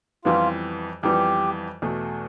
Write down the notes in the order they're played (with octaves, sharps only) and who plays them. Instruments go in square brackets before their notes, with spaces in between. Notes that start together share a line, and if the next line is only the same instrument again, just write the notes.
[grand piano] F2 E3 G3 B3 [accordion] F4
[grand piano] F2 E3 G3 B3 [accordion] G4
[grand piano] E2 B2 A3